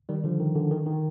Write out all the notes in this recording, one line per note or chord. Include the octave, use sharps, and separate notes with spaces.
D#3 G3
D3 F3
D#3
D3
D#3
D#3